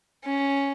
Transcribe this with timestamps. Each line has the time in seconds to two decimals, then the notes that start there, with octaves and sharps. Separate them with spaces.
0.25 C#4